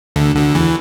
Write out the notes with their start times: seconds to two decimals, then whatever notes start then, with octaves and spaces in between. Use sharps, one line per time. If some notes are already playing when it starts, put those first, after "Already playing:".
0.16 D2 D3
0.36 D2 D3
0.55 E2 E3